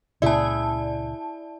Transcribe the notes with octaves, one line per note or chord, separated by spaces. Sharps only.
C#2 A#2 C#3 E4 G#4 D5 A5